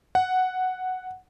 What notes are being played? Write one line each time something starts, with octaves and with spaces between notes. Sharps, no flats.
F#5